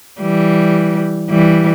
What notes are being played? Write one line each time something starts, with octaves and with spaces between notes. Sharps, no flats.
E3 G3
E3 G3